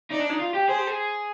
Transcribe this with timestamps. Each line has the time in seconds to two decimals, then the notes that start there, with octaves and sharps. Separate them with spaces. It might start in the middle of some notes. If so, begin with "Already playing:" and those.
0.11 D#4 D5
0.20 D4
0.30 D#4
0.39 F4
0.54 G4
0.68 G#4 C5
0.78 G4
0.87 G#4